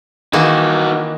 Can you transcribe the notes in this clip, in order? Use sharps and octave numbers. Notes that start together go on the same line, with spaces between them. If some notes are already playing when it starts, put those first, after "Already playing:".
D#3 E3 A#3 D#4 F#4